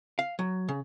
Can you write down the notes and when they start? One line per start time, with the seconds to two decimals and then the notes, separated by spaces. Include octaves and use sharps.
0.19 F5
0.39 F#3
0.69 C#3